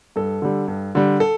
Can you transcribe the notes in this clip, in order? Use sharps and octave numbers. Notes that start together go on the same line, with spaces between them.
G2 A4
D3 G3
G2
D3 G3
A4